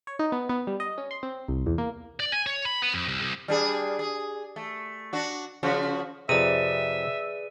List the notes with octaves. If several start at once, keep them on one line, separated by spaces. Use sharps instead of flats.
C#5
D#4
B3
B3
G3
D#5
C#4
C6
C4
C2
E2
A#3
D5
G#5
C#5
B5
B3
F2
C2
C2
G3 D4 G#4
G#4
A3
D4 F#4
C#3 F3 F#4
F2 C3 G#4 B4 D5 E5 D#7